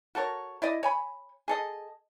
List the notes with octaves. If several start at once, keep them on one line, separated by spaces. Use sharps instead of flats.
F#4 A4 A#4 C#5
E4 D5 D#5
C#5 G#5 B5
G#4 A4 D#5